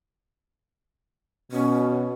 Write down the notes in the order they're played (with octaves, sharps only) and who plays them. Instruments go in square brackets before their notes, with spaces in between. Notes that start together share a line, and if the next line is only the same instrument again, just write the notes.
[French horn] B2 [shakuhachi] C#4